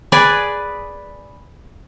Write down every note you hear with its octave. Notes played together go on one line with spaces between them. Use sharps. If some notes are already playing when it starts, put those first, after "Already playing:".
G#4 B4 D5